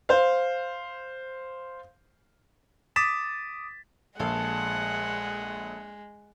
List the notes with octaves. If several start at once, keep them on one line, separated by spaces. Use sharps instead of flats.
C5 F5
D6 D#6 A6 B6 E7
A#1 G#3 A4 F5 F#5